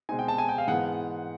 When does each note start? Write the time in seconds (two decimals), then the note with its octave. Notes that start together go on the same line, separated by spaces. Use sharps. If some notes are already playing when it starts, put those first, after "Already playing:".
0.09 B2 G#3 C4 D#4 G#5
0.19 G5
0.28 A5
0.38 G#5
0.48 G5
0.58 F5
0.68 G#2 E3 G#3 B3 F#5